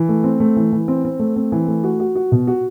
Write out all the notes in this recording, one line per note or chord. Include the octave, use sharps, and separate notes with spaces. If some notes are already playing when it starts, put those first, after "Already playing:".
Already playing: E3
A3
C4
A3
E3
E3
C4
C4
A3
C4
E3
A3
F#4
F#4
F#4
B2
F#4